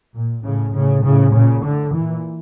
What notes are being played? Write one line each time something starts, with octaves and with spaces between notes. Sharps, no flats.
A#2
A2 C#3
A2 C#3
A2 C#3
A#2 C#3
A2 D3
A#2 E3